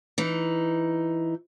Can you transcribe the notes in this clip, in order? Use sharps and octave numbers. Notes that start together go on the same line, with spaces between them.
E3 D#4